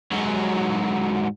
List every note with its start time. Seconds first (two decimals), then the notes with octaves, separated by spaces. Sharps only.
0.12 G#2 F#3